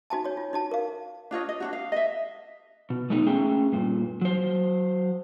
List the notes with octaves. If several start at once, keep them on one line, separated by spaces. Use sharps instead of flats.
D#4 F#4 G#5 A5
F#4 C#5
F4
D#4 F#4 A5
A#4 F5
D4 F4 C#5 D#5
D#5
D4 D#4 F#4
F5
D#5 E5
B2
G#3 A3 B3 D#4
A3 C#4 G#4 E5 G5
G2 A#2
F#3 C5